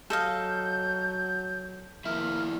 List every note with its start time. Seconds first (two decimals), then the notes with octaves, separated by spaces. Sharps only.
0.10 F#3 A4 D#5 F5 G6
2.05 F2 A#3 E4 E5 F6